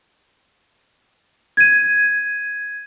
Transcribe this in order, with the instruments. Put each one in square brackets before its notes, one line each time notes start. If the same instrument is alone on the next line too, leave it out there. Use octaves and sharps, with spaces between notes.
[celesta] G#6 D#7